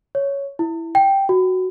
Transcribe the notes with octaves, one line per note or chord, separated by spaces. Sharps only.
C#5
E4
G5
F#4